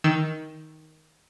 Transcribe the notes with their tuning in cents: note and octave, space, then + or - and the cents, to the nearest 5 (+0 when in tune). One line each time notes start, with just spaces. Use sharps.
D#3 +10 E6 +0